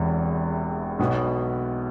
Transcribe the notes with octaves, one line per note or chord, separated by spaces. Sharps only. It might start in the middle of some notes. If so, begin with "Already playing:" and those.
Already playing: E1 E2 C3 E3
B1 B2 B3